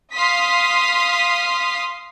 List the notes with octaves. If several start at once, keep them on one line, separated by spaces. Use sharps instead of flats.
F5 C6 D#6 B6